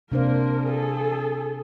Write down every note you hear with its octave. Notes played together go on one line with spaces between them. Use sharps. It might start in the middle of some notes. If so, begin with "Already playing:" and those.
C3 A#3 D4 A#4 C5
G#4 A4